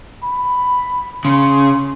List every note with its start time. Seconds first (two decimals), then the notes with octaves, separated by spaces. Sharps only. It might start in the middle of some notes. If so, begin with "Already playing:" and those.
0.23 B5
1.25 C#3 C6